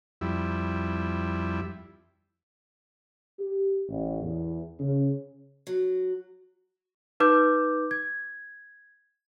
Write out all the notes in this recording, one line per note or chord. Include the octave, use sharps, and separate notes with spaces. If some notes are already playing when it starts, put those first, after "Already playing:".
F2 G3 E4
G4
A1
E2
C#3
F#3
D#4 B4 D6 G6
G#6